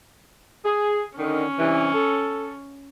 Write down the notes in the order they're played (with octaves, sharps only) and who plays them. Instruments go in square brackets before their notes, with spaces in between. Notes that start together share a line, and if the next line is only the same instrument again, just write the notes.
[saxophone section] G#4
[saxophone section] D3 D#3 [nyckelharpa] C#4
[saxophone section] G2 C3 E3
A4